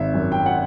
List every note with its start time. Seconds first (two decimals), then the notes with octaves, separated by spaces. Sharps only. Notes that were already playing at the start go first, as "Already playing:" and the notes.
Already playing: G#1 E5
0.14 F#2
0.32 G5
0.46 F#5